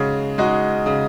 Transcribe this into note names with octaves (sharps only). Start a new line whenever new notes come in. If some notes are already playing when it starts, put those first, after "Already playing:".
Already playing: C#3 G#3 D#4 F#4
G#3 D#4 F#4
C#3